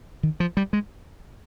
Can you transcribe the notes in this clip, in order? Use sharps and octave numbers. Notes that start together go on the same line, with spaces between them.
D#3
F3
G3
G#3